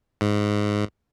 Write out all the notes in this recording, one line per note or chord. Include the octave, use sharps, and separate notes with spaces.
G#2